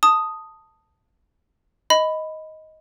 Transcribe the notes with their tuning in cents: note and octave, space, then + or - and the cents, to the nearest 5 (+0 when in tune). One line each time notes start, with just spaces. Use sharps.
A5 +10 D#6 +0
D#5 +10 B5 +10